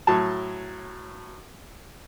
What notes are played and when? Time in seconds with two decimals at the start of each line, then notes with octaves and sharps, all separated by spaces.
0.07 A2 F#3 A5